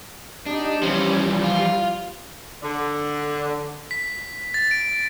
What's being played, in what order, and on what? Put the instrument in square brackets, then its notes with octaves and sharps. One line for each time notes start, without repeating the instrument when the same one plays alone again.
[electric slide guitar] D4 [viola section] D#4 G4
[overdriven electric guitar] E3 F3 [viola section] G3 [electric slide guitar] C#4
[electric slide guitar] F4
[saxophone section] D3
[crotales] B6
A6
D7